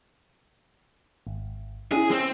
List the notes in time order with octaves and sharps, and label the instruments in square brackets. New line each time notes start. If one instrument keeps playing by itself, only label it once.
[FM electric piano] G#1
[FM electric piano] C#4 E4 [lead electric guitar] G#4
[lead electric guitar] C4